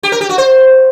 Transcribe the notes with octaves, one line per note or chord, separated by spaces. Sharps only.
G4
A#4
G4
F#4
C5